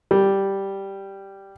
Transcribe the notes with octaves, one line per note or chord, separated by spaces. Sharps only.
G3